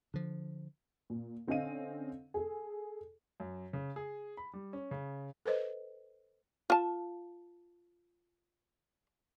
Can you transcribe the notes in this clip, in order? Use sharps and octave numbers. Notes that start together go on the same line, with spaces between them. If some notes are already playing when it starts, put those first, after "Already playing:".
D3 F3
A#2
D3 C4 C#4 D#5 F5 D#7
G#4 A4
F#2
C#3
G#4
B5
G3
C#4
C#3
A4 B4 C5 D#5
F4 A5